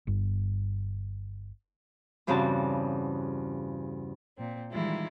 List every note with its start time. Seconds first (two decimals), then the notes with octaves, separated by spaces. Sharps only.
0.07 G1 G2
2.27 E2 G2 C#3 C4 F#4 A5
4.38 A#2 C4
4.72 D#3 E3 G3 G#3 E4 F4